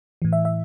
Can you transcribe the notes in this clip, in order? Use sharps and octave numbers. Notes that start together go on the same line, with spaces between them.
A2 E3
E5
E5